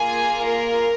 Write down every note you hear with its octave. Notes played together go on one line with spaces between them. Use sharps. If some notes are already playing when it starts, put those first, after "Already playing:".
Already playing: A#3 F4 G#4 G#5
A#4